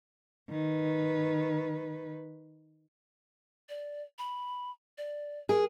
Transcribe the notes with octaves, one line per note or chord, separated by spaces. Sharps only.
D#3 B4
D5
B5
D5
G#4 A#4